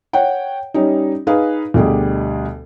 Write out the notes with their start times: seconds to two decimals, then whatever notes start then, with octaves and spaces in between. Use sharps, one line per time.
0.13 C#5 F#5 G5
0.74 G3 C#4 D#4
1.27 D#4 G#4 B4 F5
1.74 D2 B2 G3 G4 G#4